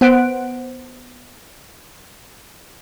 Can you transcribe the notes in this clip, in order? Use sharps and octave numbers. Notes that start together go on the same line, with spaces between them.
B3 C5 F#5 F#6 D7